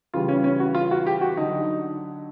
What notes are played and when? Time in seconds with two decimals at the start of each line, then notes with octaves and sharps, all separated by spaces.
0.13 C#3 E3 G3 F4
0.28 C#4
0.44 C#4
0.60 F#4
0.75 F4
0.91 F#4
1.06 G4
1.21 F#4
1.37 D3 F#3 D#4